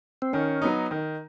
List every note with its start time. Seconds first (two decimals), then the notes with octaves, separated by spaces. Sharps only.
0.22 C4
0.33 D#3 C#4
0.62 F#3 B3 D#4
0.91 D#3